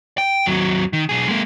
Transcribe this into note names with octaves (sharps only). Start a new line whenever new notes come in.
G5
D#2 F#3
D#3
B1 G#4
G#3 A#3